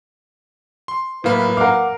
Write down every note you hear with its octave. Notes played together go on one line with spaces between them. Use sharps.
C6
A2 F#3 A#3 E4 B4 F5 B5
A#4 F5 F#5 D6